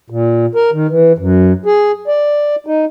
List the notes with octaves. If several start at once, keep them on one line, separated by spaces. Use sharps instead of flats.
A#2
A#4
D#3
E3
F#2
G#4
D5
D#4